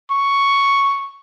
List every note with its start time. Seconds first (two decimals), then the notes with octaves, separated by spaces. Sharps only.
0.11 C#6